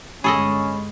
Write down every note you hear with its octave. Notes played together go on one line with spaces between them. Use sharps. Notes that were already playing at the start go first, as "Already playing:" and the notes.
G1 G#3 C#4 G#4 A4 D#5 B5 C#6